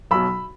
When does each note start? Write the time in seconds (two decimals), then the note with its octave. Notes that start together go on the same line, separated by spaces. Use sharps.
0.11 B1 B2 F#3 B5 E6